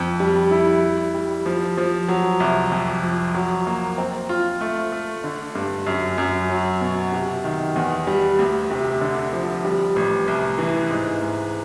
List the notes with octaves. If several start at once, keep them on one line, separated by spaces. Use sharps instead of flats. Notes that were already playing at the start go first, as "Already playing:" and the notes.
Already playing: F2
G3
E4
G3
G3
F3
F3
F#3
C2
F2
F3
F#3
A#3
C4
F4
A3
A3
D3
G2
F#2
F#2
F#3
B2
C3
D#3
E2
G3
D2
C3
D3
F3
G3
A1
C2
E3
G#2
G#2